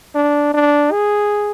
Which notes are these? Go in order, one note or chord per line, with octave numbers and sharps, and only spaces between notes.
D4
D4
G#4